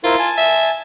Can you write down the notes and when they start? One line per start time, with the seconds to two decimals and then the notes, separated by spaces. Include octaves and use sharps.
0.04 E4 F4 A#4 C5
0.19 G#5 A5
0.37 E5